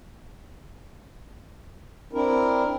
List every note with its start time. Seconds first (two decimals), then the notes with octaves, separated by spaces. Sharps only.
2.13 C4 D4 E4 A#4